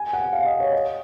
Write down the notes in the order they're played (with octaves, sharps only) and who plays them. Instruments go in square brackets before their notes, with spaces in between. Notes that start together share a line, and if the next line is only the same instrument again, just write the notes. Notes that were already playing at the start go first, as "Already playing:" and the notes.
Already playing: [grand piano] G#5
F#5
F5
D#5
C#5
D#5